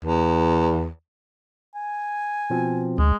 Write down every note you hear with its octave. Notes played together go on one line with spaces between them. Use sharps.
E2
G#5
B2 F3 C4
D2 G#3